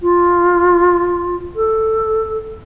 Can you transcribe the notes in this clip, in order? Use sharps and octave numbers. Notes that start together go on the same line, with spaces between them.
F4
A4